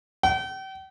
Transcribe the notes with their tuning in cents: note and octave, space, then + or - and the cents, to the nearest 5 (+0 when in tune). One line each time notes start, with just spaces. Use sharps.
G5 -40